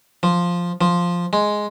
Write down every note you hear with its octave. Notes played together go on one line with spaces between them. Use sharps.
F3
F3
G#3